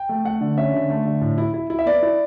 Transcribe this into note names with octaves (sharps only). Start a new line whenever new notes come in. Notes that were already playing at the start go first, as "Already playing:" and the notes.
Already playing: G5
A3
A3 F#5
D3
C#4 E5
D3
A3
D3
A2
E4
E4
E4
E5
B3 D5
E4